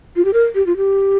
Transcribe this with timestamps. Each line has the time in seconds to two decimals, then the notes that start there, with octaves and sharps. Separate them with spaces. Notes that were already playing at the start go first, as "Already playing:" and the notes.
0.16 F4
0.25 G4
0.33 A#4
0.55 G4
0.67 F4
0.77 G4